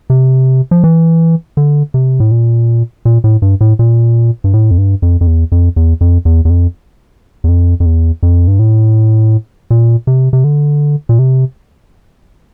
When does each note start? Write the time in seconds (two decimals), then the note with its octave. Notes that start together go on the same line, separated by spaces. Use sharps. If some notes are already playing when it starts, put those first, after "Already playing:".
0.10 C3
0.71 F3
0.84 E3
1.57 D3
1.94 C3
2.20 A2
2.31 A#2
3.05 A#2
3.24 A2
3.42 G2
3.61 A2
3.79 A#2
4.44 G2
4.53 A2
4.71 F2
4.78 G2
5.02 F2
5.21 F2
5.27 E2
5.52 F2
5.76 E2
6.01 F2
6.25 E2
6.45 E2
6.50 F2
7.44 E2
7.48 F2
7.80 F2
7.86 E2
8.23 F2
8.48 G2
8.59 A2
9.70 A#2
10.07 C3
10.33 C3
10.44 D3
11.09 A#2
11.19 C3